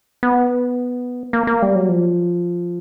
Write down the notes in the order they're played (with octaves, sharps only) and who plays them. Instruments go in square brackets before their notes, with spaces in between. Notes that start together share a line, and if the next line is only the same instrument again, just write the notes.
[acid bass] B3
A#3
A#3
G3
F#3
F3